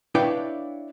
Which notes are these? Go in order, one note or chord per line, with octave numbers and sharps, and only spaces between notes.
D4 E4 B4 C#5 F5 G5